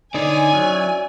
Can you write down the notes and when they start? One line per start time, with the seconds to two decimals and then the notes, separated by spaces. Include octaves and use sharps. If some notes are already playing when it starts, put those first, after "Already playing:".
0.14 D3 D#4 C#5 D5 G#5
0.53 F#3 C#4 E4